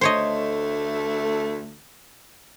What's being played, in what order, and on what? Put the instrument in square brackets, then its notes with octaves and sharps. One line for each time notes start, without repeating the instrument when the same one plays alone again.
[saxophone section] D2 A3 [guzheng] C5 C#5 D#5